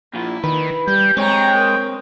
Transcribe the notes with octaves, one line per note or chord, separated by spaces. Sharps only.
A#2 F3 E4 F4
D#3 B4
G3 G4 G6
G#3 C4 C#5 G5 A#5 C#6
A#4